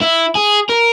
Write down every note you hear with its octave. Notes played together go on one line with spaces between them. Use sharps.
E4
G#4
A#4